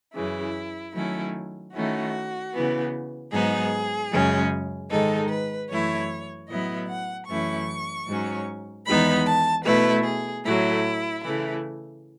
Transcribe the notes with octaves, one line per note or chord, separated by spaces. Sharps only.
F#2 C#3 E3 E4
D#3 F#3 A3 C#4 E4
D#3 A3 C#4 E4 F#4
C#3 E3 B3
G#2 F#3 B3 D#4 G#4
F#2 C#3 G#3 C#4
G#2 D#3 G#3 D#4 A4
B4
F#2 E3 A3 E4 C#5
A2 F#3 B3 E4 D#5
F#5
F#2 E3 A3 C#4 E4 C#6
G#2 F#3 C#4
E2 D#3 G#3 B3 D#4 B5
A5
B2 A3 E4 B4
G#4
A2 F#3 A3 E4
C#3 E3 A3 E4